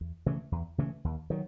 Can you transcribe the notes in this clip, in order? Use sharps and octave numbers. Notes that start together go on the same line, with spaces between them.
E2
C#3 E3 A3
E2
C#3 E3 A3
D#2
D#3 F#3